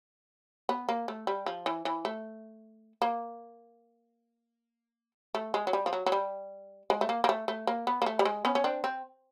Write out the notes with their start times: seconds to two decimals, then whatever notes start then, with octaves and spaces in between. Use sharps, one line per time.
0.69 B3
0.89 A#3
1.08 A3
1.27 G3
1.46 F3
1.66 E3
1.85 E3
2.05 A3
3.02 A#3
5.35 A3
5.54 G#3
5.67 F#3
5.73 G3
5.86 F3
5.93 F#3
6.06 F#3
6.12 G3
6.90 G#3
7.01 A3
7.09 A#3
7.24 A#3
7.29 A3
7.48 A3
7.67 A#3
7.87 B3
8.02 A#3
8.06 A3
8.19 G3
8.25 G#3
8.45 B3 C#4
8.55 C#4
8.64 C4 D4
8.84 C4